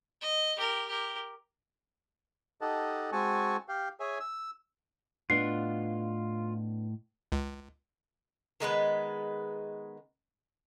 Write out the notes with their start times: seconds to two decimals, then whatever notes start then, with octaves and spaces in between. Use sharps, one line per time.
0.22 D#5
0.57 G4 A#4
0.88 G4 A#4
2.61 D#4 G4 A4 D#5 F#5 A5
3.12 G#3 C4 F#4 G#5 A5 C#6
3.69 G4 F5 G5
4.00 G#4 C#5 E5 G#5
4.20 E6
5.30 A2 B3 D4 F4 D#5 C7
7.32 C#2
8.60 D#3 G#3 B3 B4